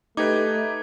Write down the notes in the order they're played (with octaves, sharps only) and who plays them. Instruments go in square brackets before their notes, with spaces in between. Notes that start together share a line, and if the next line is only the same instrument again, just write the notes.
[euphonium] A3 [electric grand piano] D#4 G4 B4 [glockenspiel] D6 G#6